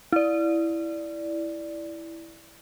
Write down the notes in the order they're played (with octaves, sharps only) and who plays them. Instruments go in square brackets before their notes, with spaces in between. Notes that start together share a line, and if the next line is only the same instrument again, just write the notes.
[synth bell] E4 D5